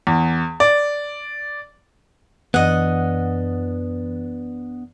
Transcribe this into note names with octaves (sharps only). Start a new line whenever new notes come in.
E2
D5
F#2 E3 B3 D4 D#5 F#5